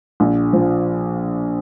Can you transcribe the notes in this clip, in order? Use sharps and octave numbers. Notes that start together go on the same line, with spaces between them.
A#1
F3